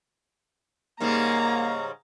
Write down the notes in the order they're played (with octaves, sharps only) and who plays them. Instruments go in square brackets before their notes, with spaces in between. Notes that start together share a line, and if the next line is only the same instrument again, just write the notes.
[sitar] G#2 C#3 G3 [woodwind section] A#3 [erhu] A#5